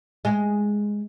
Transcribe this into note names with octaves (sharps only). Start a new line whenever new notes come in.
G#3